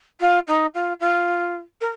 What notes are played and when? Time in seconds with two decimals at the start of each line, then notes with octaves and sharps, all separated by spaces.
0.20 F4
0.47 D#4
0.74 F4
1.00 F4
1.81 A#4